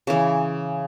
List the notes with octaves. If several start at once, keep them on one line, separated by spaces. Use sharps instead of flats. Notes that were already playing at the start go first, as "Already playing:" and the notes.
C#3 E3